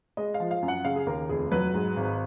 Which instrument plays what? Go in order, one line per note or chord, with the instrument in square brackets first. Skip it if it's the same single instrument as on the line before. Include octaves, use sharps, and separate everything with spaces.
[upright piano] G#3 D#5
F5
F3
F5
F#2
F#5
C#3 F5
G#4
D#2 A#4
F1 G#4
F#3 B4
G#2
G#1